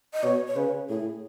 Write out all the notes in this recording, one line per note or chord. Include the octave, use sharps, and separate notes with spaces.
D#5
B2 C#5
C#5
C#3 B4
A2 G#4